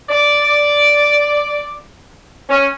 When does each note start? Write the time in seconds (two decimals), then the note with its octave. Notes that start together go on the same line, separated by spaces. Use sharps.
0.09 D5
2.49 C#4